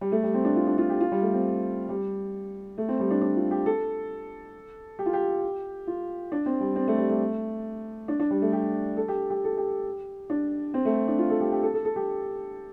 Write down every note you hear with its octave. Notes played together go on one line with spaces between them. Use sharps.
G3
A3
G3
C4
D4
F4
D4
F4
G4
F4
G3
A3
C4
G3
A3
C4
G3
D4
D4
F4
G4
A4
G4
F4
G4
F4
D4
C4
G3
C4
A3
G3
A3
D4
D4
G3
A3
G4
A4
G4
G4
A4
G4
D4
C4
A3
D4
F4
A4
G4
G4
A4
A4
A4
G4